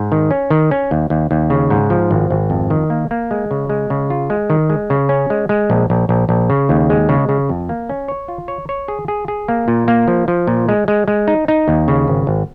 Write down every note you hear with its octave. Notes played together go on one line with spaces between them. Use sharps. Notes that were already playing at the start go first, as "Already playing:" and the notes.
Already playing: G#2
D#3
C#4
D#3
C#4
D#2
D#2
D#2
C#3
G#2
F3
G#1
G#1
F2
D#3
A#3
A#3
G#3
C#3
G#3
C#3
F4
G#3
D#3
G#3
C#3
C#4
G#3
G#3
A#1
A#1
A#1
A#1
C#3
D#2
G#3
C#3
C#3
F2
A#3
C#4
C#5
F4
C#5
C#5
G#4
G#4
G#4
A#3
A#2
A#3
F3
F3
A#2
G#3
G#3
G#3
D#4
D#4
D#2
C#3
G#1
G#1